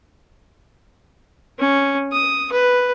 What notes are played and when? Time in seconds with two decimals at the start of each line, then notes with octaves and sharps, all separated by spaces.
1.59 C#4
2.12 D#6
2.53 B4